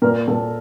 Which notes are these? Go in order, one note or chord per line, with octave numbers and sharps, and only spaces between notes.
A#2 A#4
A#2 A4